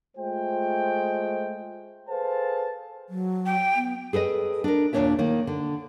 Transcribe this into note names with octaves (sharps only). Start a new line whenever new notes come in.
G#3 A3 F4 C5 G5
G#4 A4 B4 C5 F5 A5
F#3
G5
B3
G#4 A4 B4 D#5
D4 A#4
D#2 A#2 A#3 D4 C#5 E5
D#3 A#3
D3